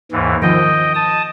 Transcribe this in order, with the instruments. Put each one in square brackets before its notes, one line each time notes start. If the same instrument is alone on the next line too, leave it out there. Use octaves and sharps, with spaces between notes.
[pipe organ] D#2 G#2 E3
[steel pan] D#3 F3 [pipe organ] D#5 G5
[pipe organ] A5 D#6